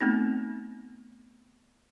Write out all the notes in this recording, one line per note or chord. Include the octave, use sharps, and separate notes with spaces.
A3 B3 C4 D#4